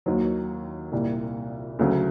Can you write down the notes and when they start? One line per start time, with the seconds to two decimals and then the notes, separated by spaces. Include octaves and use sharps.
0.06 D#2 D#3 F#3
0.92 C2 A#2 G3
1.79 D2 C#3 F#3